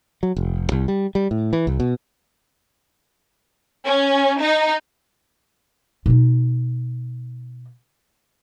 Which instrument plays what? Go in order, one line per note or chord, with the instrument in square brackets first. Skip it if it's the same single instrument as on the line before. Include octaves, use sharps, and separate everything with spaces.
[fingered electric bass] F#3
F1
C2
G3
G3
A2
E3
C2
B2
[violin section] C#4
D#4
[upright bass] B2 D#4